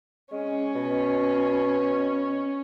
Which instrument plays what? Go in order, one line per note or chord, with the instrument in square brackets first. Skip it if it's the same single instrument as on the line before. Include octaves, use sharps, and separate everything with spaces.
[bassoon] G#3 [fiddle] C#4
[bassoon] B2